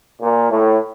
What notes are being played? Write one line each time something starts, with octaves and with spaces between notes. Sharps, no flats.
A#2
A2